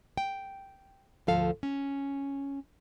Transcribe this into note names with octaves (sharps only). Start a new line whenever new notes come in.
G5
D2 G#2 F3 A4 F5
C#4